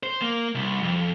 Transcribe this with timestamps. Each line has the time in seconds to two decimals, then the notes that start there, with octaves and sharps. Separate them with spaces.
0.03 C5
0.21 A#3
0.55 C2
0.83 F2